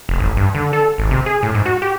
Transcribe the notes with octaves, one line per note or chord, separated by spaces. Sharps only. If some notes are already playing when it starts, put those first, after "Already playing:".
F1
A1
G2
D3
A4
G#1
C3
G#4
A2
G#2
F#4
G4